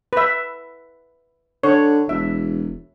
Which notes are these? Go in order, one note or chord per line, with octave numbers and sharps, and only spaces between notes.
B4 E5
D3 C#5
E1 E5